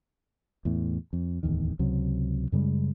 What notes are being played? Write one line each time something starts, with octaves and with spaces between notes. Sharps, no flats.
E2 A2
F2
D1 G#1 E2 D#3
C#2 C3 F#3
F#2 C#3 G3 G#3